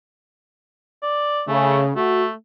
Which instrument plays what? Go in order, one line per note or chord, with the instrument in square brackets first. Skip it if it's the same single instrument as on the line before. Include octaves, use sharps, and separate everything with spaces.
[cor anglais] D5
[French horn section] C#3 [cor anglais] A3
[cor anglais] A3 [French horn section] F#4